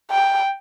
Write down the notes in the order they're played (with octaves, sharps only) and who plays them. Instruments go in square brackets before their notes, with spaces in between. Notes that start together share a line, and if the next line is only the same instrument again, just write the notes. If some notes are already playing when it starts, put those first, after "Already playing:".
[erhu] G5